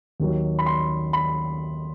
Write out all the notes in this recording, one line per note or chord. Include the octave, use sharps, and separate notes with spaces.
D#2 D#3 F#3
B5
C6
B5